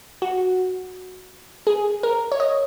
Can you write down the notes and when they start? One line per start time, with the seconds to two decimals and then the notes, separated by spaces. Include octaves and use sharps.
0.22 F#4
1.67 G#4
2.03 A#4
2.32 C#5
2.40 D#5